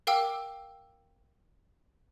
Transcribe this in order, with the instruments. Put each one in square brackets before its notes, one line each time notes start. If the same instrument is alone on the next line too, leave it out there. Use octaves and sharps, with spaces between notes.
[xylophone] A#4 F5 G5 D6 E6